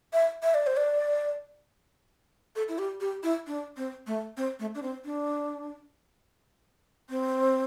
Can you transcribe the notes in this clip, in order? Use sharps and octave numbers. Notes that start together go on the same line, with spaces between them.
E5
E5
D5
C5
D5
A4
E4
G4
G4
E4
D4
C4
A3
C4
A3
D4
C4
D4
C4